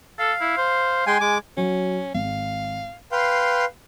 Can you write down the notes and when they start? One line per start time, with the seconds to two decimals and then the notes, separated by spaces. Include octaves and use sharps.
0.19 A4 F5
0.41 E4
0.57 C5
1.07 G#3 G5 G#5 C6
1.21 G#3 D6
1.57 F#3 C#4
2.14 G#1 F5
3.12 B4 F5 G5 C6